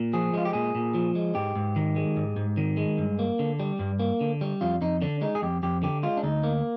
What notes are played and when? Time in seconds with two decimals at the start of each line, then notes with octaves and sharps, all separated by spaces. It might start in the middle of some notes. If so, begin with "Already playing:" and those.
Already playing: A#2
0.13 F3 G#4
0.34 G#3 F4
0.45 G4
0.53 A#2 G#4
0.75 A#2
0.95 F3
1.15 G#3
1.35 G#2 G4
1.56 G#2
1.76 D#3
1.96 G#3
2.16 G#2
2.37 G#2
2.57 D#3
2.77 G#3
2.98 G2
3.19 A#3
3.39 D3
3.60 G3
3.79 G2
3.99 A#3
4.21 D3
4.41 G3
4.61 F2 F4
4.81 F2 D#4
5.02 D3 D4
5.21 G#3 D#4
5.35 G#4
5.42 F2 G4
5.63 F2 G4
5.83 D3 G4
6.03 G#3 F4
6.17 D4
6.23 D2 D#4
6.44 A#3